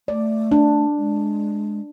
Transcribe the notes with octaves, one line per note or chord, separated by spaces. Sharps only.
A3 D5
D4
G#3